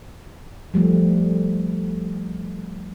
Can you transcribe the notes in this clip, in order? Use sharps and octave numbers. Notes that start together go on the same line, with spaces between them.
F3 G3 A3